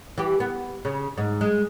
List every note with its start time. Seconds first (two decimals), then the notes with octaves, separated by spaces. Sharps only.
0.18 E3 G4
0.40 B3
0.85 C#3
1.17 G#2
1.41 G#3